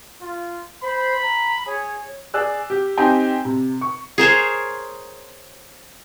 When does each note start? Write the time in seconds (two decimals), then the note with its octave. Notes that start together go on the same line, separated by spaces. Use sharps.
0.21 F4
0.82 C5 B5
1.22 A#5
1.66 G#4 C#5
2.34 G#4 D5 E6 F#6
2.70 G4
2.97 C4 D#4 G4 G5 G#5
3.45 C3
3.81 C#6
4.18 G#4 A#4 C5 C#5